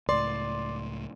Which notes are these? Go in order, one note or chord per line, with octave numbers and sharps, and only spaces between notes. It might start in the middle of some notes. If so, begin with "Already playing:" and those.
C#2 A2 D5 C6